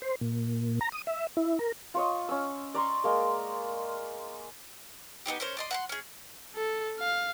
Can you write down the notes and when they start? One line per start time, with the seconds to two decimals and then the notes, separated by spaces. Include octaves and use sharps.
0.02 C5
0.21 A#2
0.81 A#5
0.92 D#6
1.07 E5
1.37 E4
1.59 A#4
1.94 F4 C#5 D#5
2.29 C#4 E6
2.74 D5 A#5 C6 C#6
3.04 G#3 A#3 A#4
5.26 B3 C4 D#4 G4
5.40 C#4 A#4 C5 C#5
5.57 D5 D#5 C6
5.71 F#5 A#5 C6
5.89 C#4 G#4
6.56 A4
7.00 F5